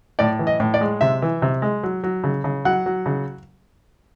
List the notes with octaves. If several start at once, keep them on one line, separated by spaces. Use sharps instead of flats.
A2 D5
E3
D#5
A2
D5
G#3
C3 E5
E3
C3
G#3
F#3
F#3
C#3
C#3
F#3 F#5
F#3
C#3